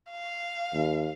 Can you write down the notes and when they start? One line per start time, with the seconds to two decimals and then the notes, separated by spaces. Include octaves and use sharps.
0.11 F5
0.74 D#2